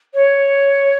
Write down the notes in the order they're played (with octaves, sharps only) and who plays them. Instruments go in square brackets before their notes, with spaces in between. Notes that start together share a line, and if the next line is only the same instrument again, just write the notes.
[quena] C#5